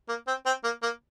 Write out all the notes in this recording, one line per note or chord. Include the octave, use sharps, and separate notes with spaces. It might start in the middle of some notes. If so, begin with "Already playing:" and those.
A#3
C4
C4
A#3
A#3